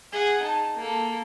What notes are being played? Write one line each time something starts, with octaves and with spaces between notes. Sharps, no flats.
G#4 F#5
D#4 A5
A#3 A4